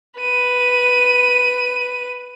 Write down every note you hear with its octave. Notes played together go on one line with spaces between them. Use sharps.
B4 D#7